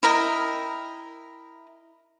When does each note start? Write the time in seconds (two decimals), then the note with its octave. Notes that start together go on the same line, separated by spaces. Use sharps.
0.03 E4 A#4 D#5 G5